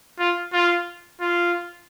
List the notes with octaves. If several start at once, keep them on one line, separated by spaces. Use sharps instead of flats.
F4
F4
F4